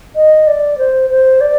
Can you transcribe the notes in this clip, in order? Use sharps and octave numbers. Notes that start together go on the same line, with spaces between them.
D#5
D5
C5
C5
D5